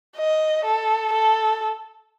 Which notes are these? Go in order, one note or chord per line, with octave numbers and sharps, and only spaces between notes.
D#5
A4
A4